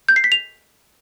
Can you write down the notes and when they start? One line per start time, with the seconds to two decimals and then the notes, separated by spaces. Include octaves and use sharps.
0.09 G6
0.16 C7
0.24 B6
0.32 F7